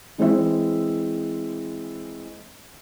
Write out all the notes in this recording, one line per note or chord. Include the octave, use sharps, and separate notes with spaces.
E3 G#3 C4 E5